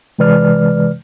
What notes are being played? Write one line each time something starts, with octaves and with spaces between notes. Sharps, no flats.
C3 E3 G#3 B4 D5 F6